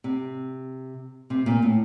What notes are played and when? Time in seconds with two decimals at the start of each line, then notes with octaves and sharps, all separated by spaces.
0.04 C3
1.30 C3
1.46 A#2
1.62 A2